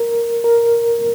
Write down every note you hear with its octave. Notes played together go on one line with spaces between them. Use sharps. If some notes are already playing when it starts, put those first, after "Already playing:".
Already playing: A#4
A#4